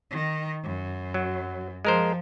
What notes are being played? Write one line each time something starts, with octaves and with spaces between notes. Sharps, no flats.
D#3
F#2
F#3
F3 G#3 A#4 C5